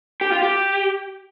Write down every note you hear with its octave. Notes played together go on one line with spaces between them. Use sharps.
G4
F4
G4